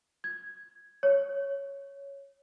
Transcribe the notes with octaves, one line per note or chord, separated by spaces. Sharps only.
G#6
C#5